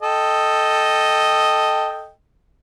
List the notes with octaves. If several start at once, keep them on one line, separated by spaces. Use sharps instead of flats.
A4 D#5 G5